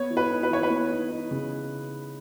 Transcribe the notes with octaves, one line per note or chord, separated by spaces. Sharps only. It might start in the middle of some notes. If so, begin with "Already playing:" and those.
Already playing: B3 C#5
E3
B4
D#4
B4
E3 C#5
B4
B3
D#4
D#4
C#3